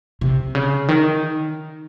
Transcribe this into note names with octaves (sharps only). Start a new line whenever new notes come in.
C3
C#3
D#3